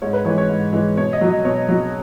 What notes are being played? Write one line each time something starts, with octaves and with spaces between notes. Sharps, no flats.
G#2 C#5
B4
E3 G#3 C#5
C#5
G#2
E3 G#3
B2 C#5
D#5
F#3
D#5
B2 C#5
F#3